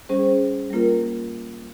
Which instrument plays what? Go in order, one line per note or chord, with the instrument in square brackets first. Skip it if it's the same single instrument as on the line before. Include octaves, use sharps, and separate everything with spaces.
[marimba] G3 C#4 G#4 C5
G3 A#3 F4 A#4